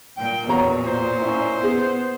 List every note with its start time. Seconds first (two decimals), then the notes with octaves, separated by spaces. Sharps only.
0.18 A#2 G5
0.49 E2 F#4 C#5 A#5
0.87 C5
1.19 C#4 E4
1.64 B3 G#4